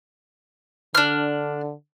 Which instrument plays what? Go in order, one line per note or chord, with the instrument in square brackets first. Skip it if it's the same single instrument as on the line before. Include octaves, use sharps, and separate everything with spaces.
[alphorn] D3 [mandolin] D4 F6